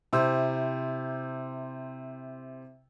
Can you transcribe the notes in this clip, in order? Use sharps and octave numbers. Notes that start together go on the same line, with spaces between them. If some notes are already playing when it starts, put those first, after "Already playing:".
C3 E4 C5 E6